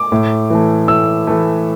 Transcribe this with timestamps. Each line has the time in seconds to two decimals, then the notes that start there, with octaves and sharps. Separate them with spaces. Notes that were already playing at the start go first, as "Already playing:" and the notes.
Already playing: D6
0.12 A2
0.50 E3 A3
0.88 A2 E6
1.27 E3 A3